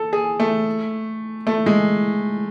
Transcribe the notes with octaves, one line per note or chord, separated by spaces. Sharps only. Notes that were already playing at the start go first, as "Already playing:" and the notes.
Already playing: A4
G#4
A3
A3
G#3